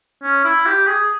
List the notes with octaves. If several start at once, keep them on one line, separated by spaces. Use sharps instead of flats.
C#4
E4
G4
G#4